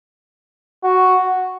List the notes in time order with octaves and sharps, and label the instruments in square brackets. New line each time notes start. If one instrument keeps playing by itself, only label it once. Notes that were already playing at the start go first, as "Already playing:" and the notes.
[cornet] F#4